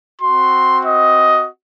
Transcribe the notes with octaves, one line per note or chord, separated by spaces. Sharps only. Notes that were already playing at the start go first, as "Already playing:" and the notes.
C4 F#4 C6
D#5